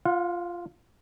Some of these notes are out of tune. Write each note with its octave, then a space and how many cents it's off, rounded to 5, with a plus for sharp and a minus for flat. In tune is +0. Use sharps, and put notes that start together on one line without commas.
F4 -5 F#5 -45